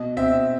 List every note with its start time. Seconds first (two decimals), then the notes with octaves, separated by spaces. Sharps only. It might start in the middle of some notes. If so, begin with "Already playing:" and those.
Already playing: B2 D#5
0.17 C4 E5